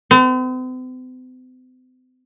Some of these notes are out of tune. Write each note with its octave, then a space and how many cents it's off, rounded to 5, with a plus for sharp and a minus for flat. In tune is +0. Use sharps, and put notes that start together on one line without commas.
C4 -45